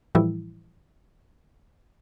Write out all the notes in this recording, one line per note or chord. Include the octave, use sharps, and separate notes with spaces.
A2 E3 F3 G3 E4